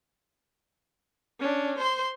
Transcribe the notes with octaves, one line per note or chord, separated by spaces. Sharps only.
C#4 D4
C5 C6